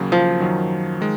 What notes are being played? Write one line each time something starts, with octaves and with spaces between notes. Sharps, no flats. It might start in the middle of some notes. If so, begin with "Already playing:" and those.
Already playing: D#2 C#3 F#3 A#3
F3
F#2 D#3 F#3
D#3 G#3